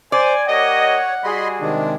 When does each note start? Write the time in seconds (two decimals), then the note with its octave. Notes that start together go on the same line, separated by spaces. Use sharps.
0.12 C5 D5 G#5
0.48 A#3 G4 C#5 D#5 F#5
1.24 G3 F#4 G#4 D#5 B5 C6
1.61 C3 D#3 G#3 D4